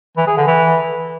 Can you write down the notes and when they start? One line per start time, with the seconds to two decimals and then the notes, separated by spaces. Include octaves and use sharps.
0.17 E3
0.27 G#4
0.37 D3
0.47 E3